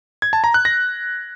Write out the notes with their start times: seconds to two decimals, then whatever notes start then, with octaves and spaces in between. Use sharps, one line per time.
0.22 G#6
0.33 A5
0.44 A#5
0.54 F#6
0.65 A#6